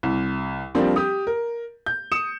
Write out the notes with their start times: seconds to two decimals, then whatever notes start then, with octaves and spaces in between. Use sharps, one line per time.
0.03 C2
0.75 F3 G3 A#3 C4 D4
0.96 G4 D#6
1.27 A#4
1.86 G6
2.12 D#6 C#7 E7